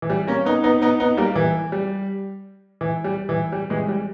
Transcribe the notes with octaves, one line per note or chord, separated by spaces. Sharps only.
E3
G3
A#3 C#4
B3 D#4
B3 D#4
B3 D#4
B3 D#4
G3 A#3
E3
G3
E3
G3
E3
G3
E3 G#3
G3